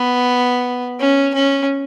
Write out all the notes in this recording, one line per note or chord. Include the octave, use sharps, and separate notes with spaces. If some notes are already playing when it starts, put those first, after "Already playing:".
Already playing: B3
C#4
C#4